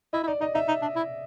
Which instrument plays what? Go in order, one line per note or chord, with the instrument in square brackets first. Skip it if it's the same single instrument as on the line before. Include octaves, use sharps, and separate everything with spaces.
[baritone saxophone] E4 [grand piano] D#5
[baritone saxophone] E4
[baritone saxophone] D#4 [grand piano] D5
[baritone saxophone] D#4 [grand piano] D#5
[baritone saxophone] D#4 [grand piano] E5
[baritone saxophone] D#4
D4
E4